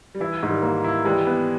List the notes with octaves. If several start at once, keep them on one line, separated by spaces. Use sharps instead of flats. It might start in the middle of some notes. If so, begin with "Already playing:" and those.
G3
E3 E4
G#2
D#3 G3
A#3
E4
E3 G3 G#3
B3